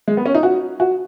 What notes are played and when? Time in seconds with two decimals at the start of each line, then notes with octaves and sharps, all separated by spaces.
0.08 G#3
0.17 B3
0.26 C#4
0.35 D#4
0.43 F#4
0.80 F#4